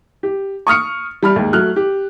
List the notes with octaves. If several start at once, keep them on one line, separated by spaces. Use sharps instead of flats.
G4
C#6 D#6 F6 C#7
G3 B5 F6
D#2 G#2
F#3 A3 F6 F#6
G4